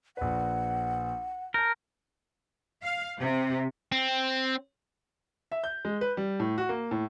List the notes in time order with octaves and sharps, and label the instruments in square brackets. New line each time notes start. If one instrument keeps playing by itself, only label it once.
[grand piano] A#1 B4 [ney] F#5
[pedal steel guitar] A#4 [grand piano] A5 G6
[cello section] F5
C3
[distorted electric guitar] C4
[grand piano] E5
G6
G#3
B4
G3
A2
F#4
A#3
A2